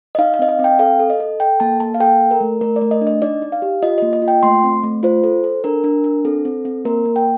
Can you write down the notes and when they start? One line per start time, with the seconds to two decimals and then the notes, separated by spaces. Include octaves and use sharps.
0.15 D#5
0.18 D#4 F5
0.34 F5
0.39 C4 D#5
0.49 F5
0.59 C4
0.64 G5
0.79 A4 F5
1.00 A4
1.10 D#5
1.20 A4
1.40 A4 G5
1.60 A#3 A5
1.80 A#3 A5
1.94 F5
2.00 A4 G5
2.21 A4
2.31 A#4
2.41 A3
2.61 A3 A#4
2.76 D5
2.81 A3
2.91 D#5
3.01 D4
3.07 D#5
3.22 D#4 D5
3.42 D#4
3.52 F5
3.62 G4
3.83 F4 D#5
3.98 A#3 D#5
4.13 D#5
4.22 F4
4.28 G5
4.43 A3 C6
4.64 C4
4.83 A3
5.03 F4 C5
5.24 A4
5.44 A4
5.64 D4 A#4
5.84 D4
6.04 D4
6.25 C4 A4
6.45 C4
6.65 C4
6.85 A#3 A#4
7.05 A#3
7.16 G5